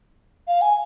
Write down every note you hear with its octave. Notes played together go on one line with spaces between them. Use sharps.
F5
G#5